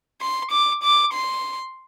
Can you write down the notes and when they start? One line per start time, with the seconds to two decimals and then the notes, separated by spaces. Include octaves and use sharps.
0.21 C6
0.51 D6
0.83 D6
1.13 C6